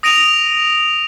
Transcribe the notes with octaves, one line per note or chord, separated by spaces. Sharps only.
D#6 A#6 D7 D#7 F7